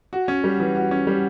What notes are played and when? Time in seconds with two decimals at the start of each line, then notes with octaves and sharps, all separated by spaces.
0.13 F#4
0.28 C#4
0.44 G3
0.60 E3
0.76 F#4
0.91 C#4
1.07 G3